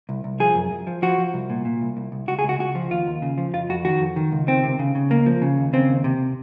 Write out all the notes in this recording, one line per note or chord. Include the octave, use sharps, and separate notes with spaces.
C2
C2
F3 G#4
F#2
F#2
F3
F3 F#4
F3
C2
A#2
A#2
C2
C2
C2
C#2 F#4
G#4
C#2 F#4
C#2 F#4
F3
D#2 F4
D#2
C#3
F3
F2 F4
F2 F#4
D#3 F#4
F2
D#3
C#2
D#3 C4
C3
C#3
C#3
C#2 A#3
F3
C#3
D#2
C#3 C4
D#2
C3